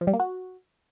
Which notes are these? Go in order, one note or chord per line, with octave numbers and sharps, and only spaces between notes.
F3
G3
A#3
F#4